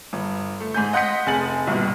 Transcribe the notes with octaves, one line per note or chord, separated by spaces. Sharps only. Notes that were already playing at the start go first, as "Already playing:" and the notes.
G1
A3
G#2 G#5 G6
D#5 F#5 C6 G6 B6 C#7
F1 G#4 A6 F#7
A#1 G2 B2